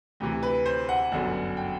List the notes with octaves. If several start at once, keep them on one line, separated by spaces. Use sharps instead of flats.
D2 C3 E3
B4
C5
F#5
G1 F#2 D3
G5